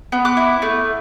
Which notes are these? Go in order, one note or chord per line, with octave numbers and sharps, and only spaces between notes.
B3
D6 F#6
E4
A3